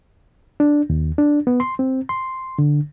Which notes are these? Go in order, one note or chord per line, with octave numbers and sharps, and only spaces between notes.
D4
D#2
D4
B3
C6
C4
C6
D3